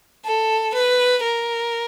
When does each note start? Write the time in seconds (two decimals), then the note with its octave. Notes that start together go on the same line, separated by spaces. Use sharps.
0.25 A4
0.74 B4
1.23 A#4